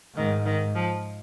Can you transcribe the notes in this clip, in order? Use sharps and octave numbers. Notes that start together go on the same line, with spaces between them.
G#2 D#3
D#3
F3